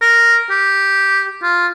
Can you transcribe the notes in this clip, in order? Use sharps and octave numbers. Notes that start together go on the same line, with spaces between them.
A#4
G4
F4